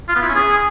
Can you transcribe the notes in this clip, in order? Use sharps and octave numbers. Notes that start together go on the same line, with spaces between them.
F4
B3
E4
C#4
G#4